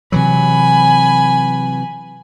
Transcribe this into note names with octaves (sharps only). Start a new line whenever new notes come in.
C3 E3 F#3 G#5 B5